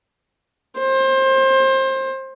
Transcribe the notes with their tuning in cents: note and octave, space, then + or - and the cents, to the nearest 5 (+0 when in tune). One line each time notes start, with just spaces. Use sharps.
C5 +25